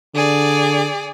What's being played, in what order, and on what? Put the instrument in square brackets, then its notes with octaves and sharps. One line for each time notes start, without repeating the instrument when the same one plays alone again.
[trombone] D3 [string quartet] G#4 D5